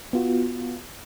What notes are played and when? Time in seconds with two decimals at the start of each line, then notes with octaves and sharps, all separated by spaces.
0.13 B3 F4 F#4